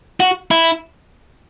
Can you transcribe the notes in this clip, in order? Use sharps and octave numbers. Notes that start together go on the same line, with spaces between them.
F#4
E4